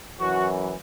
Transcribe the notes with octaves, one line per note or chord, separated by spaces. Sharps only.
F#2 E3 F#4